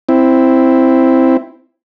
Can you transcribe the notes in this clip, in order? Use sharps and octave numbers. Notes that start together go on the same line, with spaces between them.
C4 E4